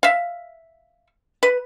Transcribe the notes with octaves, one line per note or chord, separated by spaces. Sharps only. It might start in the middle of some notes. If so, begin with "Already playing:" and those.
E5 F5
B4